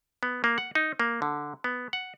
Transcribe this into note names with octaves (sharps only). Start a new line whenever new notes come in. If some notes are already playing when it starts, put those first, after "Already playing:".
B3
A#3
F#5
D#4
A#3
D3
B3
F#5